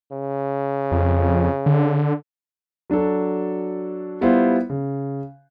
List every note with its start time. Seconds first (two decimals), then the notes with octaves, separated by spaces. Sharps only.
0.12 C#3
0.92 F2
1.66 D3
2.90 F#3 D4 F#4 A4
4.21 G3 B3 E4 F4 G4 C5
4.70 C#3